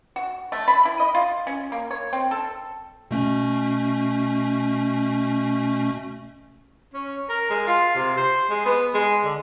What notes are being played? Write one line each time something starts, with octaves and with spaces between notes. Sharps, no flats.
F#4
A3
B5
E4
D#5
F4
C#4
A#3
C#5
C4
A4
B2 A3 C#4
C#4
A#4
G#3
F4
C3
C5
G#3
B3
G#3
D3